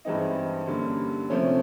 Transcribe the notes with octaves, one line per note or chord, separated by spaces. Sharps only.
G2 E3 G#3 C4 D#4
F#2 D3 G3 A#3
C3 F3 A3 C#4